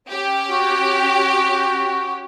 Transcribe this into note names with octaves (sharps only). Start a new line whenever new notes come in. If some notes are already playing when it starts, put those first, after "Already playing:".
C#4 G4
F#4